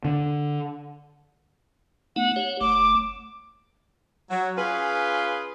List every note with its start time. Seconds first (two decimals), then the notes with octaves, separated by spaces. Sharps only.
0.05 D3
2.16 A3 B3 D#4 F#5
2.36 G4 C#5
2.61 F#1 A3 D6
4.30 F#3
4.58 C#4 F4 G#4 B4